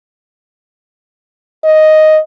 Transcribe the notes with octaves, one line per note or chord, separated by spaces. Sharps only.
D#5